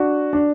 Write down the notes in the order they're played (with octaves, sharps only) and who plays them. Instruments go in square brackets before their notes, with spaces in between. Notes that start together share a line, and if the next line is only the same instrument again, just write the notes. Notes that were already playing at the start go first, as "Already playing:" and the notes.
Already playing: [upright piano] D4 F#4
D4